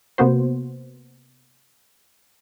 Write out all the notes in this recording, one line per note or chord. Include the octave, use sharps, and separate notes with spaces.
C3 A#3 B3 F#4 C5